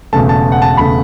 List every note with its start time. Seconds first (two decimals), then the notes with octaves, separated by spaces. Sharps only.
0.13 E1 E2 C#3 A3 A5
0.29 A5
0.52 F#5
0.62 A5
0.77 E1 C#3 A3 B5